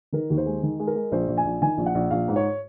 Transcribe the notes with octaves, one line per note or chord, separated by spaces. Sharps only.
D#3 A#4
D#2
C5
G#3
D#3
G#3
A#4
G#3
A#1 C5
A#1
G#5
A#1
D#3 G#5
A#1
F#5
A#1
A#1 F5
G#2
C#5